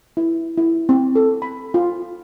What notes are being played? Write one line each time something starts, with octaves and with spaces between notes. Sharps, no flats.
E4
E4
C4
A4
B5
F4